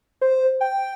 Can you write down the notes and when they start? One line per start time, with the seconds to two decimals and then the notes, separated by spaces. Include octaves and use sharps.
0.21 C5
0.61 G5